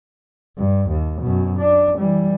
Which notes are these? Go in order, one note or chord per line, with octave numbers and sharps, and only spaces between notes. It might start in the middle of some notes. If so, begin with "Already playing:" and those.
G2
D#2
F#2 B2
D4
E3 G3